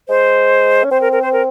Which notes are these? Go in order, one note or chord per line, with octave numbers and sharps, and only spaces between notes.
G#3 C5
C#4
C4 C5
A#4
A#4
C5
A#4